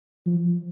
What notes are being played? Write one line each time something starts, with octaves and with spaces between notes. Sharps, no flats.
F3